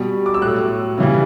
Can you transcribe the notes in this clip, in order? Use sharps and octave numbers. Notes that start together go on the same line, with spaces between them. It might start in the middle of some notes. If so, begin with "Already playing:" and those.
Already playing: B2 G3
D6
E6
A2 F#3 F#6
C#3 E3 G3